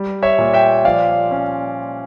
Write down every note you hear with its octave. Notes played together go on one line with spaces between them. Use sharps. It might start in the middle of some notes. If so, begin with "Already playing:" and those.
Already playing: G3
C#5 E5
A#2
E5 G5
F3 D5 F5
C#4